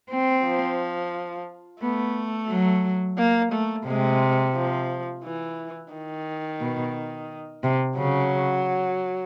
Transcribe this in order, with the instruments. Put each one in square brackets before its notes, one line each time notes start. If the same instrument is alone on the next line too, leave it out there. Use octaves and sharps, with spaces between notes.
[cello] C4
[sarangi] F3
[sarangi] A3 [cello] B3
[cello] F#3
[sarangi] A#3
A3
[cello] C3 [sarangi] G#3
[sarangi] F3
E3
D#3
[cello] B2
C3
[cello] C#3 [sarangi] F#3